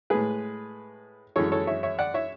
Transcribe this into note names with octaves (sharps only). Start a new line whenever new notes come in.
A2 G#3 G#4 B4
F#2 E3 G#3 A4 C#5
A4 C#5
C#5 E5
C#5 E5
D5 F#5
C#5 E5